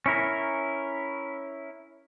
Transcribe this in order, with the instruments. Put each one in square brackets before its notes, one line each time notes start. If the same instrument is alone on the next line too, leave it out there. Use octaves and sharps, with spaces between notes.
[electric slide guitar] C#4 E4 A#4